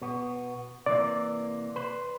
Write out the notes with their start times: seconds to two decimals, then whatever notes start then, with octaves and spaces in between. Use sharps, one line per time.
0.02 B2 B3
0.86 C3 E3 A#3 D5
1.76 B4 C5 B5